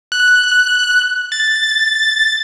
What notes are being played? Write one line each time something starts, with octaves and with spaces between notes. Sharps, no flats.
F#6
A6